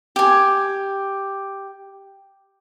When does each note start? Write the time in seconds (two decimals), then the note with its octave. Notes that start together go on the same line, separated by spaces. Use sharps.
0.16 G4 G#5